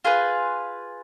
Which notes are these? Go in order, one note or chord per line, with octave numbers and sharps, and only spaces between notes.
F4 G#4 B4